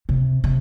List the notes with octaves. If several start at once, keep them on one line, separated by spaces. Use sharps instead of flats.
C3
C3